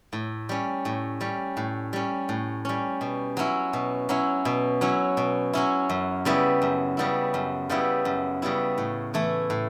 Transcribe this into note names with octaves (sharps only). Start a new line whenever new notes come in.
A2
G3 C#4
A2
G3 C#4
A2
G3 C#4
A2
G3 C#4
B2
F#3 C#4 E4
B2
F#3 C#4 E4
B2
F#3 C#4 E4
B2
F#3 C#4 E4
F#2
C#3 G3 B3 E4
F#2
C#3 G3 B3 E4
F#2
C#3 G3 B3 E4
F#2
C#3 G3 B3 E4
A2
E3 A3 E4
A2